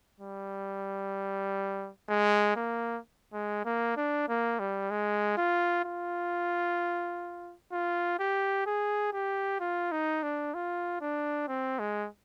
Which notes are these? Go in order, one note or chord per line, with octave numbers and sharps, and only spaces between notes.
G3
G#3
A#3
G#3
A#3
D4
A#3
G3
G#3
F4
F4
F4
G4
G#4
G4
F4
D#4
D4
F4
D4
C4
G#3